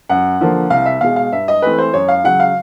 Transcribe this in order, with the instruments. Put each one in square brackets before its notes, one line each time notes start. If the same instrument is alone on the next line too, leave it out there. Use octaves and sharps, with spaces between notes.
[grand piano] F#2 F#5
D3 F3 A#3
C2 F5
E5
B2 G#3 F5
F5
G2 E5
D#5
E3 A3 C4 B4
C5
F#2 C#5
F5
C#3 F#3 F#5
F5